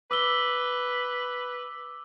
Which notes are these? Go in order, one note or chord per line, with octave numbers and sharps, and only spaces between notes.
B4 D6 E6 G7